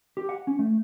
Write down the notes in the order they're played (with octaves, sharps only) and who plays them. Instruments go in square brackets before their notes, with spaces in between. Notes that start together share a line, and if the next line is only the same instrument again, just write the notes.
[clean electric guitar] G4
F#5
C#4
A3